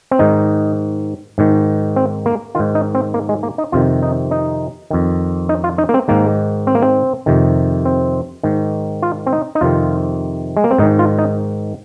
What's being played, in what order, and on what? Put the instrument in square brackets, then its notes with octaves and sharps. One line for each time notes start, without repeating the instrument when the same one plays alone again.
[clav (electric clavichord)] C4
G#2 D#3 D#4
G#2 D#3
C4
A#3
G#2 D#3 F4
D#4
C4
A#3
G#3
A#3
D#4
F2 C3 D#3 F4
D#4
D#4
F2 D#3
D#4
F4
D#4
A#3
C4
G#2 D#3 A#3
C4
A#3
C4
F2 C3 D#3
C4
G#2 D#3
F4
C4
D#4
D#4
F2 C3 D#3 F4
G#3
A#3
C4
G#2 D#3 D#4
F4
D#4